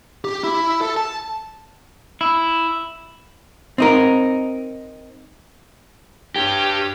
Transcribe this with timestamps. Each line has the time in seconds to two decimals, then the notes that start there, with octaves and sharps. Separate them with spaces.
0.25 G4
0.44 E4
0.81 A4
0.96 A5
2.21 E4
3.78 C4 D#4 A#4
6.36 G2 G4 C#5